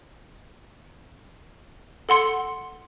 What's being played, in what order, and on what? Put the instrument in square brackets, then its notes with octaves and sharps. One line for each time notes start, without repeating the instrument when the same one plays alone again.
[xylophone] A4 F#5 C6 C#7